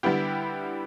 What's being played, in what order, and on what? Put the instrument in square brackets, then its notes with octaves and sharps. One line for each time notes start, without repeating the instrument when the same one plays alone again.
[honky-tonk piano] D3 G3 B3 E4 G4